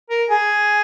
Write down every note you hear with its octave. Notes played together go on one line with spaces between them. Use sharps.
A#4
G#4